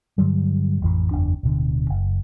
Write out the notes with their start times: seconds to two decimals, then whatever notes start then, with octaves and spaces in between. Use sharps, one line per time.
0.18 G2 D3 F#3 G3
0.82 A1 F2 E3
1.11 F#1 E2 D4
1.43 D1 B2 D3
1.90 F#1